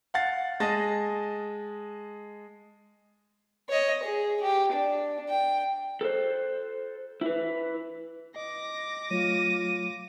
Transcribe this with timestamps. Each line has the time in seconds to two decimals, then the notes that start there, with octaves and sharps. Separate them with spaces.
0.14 F5 F#5 A6
0.60 G#3 D#5 A5 D#6 A6
3.69 C#5 D#5
4.03 G#4
4.42 G4
4.72 D4
5.29 G5
6.01 A4 C5
7.21 E4 B4
8.36 D#5 D6 A#6
9.11 F#3 A3 F4 C#5 D#7